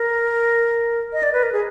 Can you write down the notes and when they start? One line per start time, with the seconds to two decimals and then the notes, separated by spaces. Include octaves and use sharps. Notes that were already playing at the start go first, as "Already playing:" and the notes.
Already playing: A#4
1.13 D#5
1.23 D5
1.33 B4
1.43 A#4
1.52 G#4